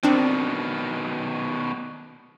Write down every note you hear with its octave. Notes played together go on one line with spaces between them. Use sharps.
B2 D#3 C4 D4